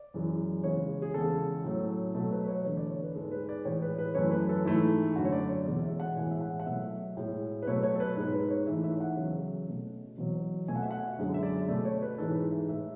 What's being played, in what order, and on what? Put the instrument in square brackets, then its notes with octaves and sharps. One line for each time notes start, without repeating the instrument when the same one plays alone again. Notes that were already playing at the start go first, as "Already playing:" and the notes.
Already playing: [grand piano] D5
F#2 E3 G#3
E2 C#3 G#3 C#5
G#4
E2 C#3 G#3 A4
A2 F#3 A3
B2 F#3 A3 A4
B4
B4
C#5
E2 D3 A3 C#5
D5
C#5
B4
G#2 G#3 A4
B4
D5
A2 E3 G#3 C#5
B4
B4
F#2 E3 A3 C#5
B4
A4
G#2 E3 A3 E4
F#2 D3 A3 F#4
C#5
D5
C#5
E2 B2 G#3 D5
E5
F#5
A2 E3 G#3 G#5
E5
F#5
F#5
B2 F#3 A3 E5
A2 G#3
B4
B2 F#3 A3 C#5
C#5
A4
B4
G#2 G#3 B4
B4
C#5
G#2 E3 A3 E5
E5
F#5
E2 C#3 F#3
B2 A3
E2 B2 F#3
B2 A3 G#5
F#5
E5
F#5
F#2 D3 G#3
E5
D5
B2 A3 D5
C#5
B4
G#2 E3 G#3 A4
B4
E5
A2 G#3 E5